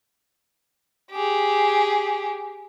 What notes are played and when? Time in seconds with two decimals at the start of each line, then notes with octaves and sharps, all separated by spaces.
1.12 G4 G#4